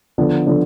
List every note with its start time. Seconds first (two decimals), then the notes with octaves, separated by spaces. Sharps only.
0.18 D3 F3 B3 D4
0.47 D3 F3 B3 D4